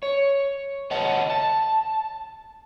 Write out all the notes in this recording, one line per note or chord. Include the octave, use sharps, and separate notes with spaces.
C#5
C#5 D#5 F#5 A5
A5